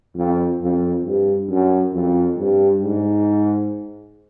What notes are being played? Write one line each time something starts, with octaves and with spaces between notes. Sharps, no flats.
F2
F2
G2
F#2
F2
G2
G#2